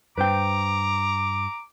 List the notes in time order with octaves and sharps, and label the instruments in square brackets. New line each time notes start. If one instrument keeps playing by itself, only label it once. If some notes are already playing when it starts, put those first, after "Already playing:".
[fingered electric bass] G2 [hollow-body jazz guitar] B4 C5 G5 [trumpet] A#5 [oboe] D6